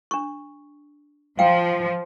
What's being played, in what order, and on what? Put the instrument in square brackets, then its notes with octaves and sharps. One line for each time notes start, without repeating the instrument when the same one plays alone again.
[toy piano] D4 C#6
[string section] F3 [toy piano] F5 G5